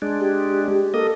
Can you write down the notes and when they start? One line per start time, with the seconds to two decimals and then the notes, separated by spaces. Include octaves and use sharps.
0.02 G#3 D4
0.20 G4
0.94 A#3 A4 D#5